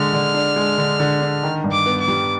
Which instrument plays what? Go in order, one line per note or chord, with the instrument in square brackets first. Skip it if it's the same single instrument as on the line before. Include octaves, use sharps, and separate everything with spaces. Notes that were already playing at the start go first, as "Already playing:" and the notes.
Already playing: [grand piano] D3 G#3 [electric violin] F6
[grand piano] D3
D4
G#3
D3
D3
D4
D#3
G2
[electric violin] D6
[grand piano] B3
[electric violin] D6
[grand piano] G3